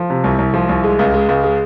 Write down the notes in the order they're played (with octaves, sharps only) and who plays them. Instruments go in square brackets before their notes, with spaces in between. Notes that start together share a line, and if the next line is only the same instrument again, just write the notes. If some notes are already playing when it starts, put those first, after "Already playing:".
Already playing: [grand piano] F3
C3
C2
C2
F3
C2
G#3
C#2
G#3
C#2
G#3